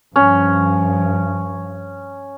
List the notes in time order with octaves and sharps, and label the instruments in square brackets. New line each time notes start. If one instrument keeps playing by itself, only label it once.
[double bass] G2 F3 [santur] C#4